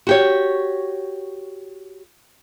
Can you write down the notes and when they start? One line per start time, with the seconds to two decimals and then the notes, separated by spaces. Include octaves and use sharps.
0.07 F#4 G4 C#5